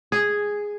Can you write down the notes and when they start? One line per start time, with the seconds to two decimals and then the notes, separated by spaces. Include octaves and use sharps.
0.12 G#4